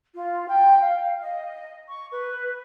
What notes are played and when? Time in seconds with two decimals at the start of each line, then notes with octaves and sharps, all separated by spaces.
0.14 F4
0.48 G5
0.80 F5
1.21 D#5
1.88 C#6
2.11 B4